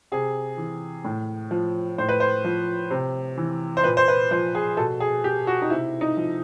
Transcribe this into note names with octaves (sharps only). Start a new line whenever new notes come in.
C3 G#4
E3
A2
F3
A2 C5
B4
C5
F3
C3
E3
C5
A#2 B4
C5
B4
F3 C5
G#4
B2 A4
G#4
G4
F#4
D#4
C3 E4
D#4
F3